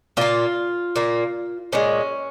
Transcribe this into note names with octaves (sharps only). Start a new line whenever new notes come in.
A#2 A#3 F4
A#2 A#3
A#2 G#3 C#4